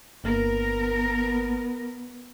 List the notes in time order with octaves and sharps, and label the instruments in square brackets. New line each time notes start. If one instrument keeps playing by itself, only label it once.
[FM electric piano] G1 A#3 [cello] B3 [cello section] A#4